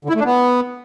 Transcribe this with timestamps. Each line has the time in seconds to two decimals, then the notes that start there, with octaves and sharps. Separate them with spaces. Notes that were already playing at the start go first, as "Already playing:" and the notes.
0.05 D3
0.10 E4
0.15 A3
0.20 D4
0.25 B3